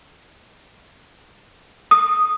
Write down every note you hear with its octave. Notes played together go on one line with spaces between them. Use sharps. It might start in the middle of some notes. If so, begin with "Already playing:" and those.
D#6